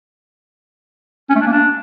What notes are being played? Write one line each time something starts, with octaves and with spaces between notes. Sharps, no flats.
C#4
A3
D4
A#3
D4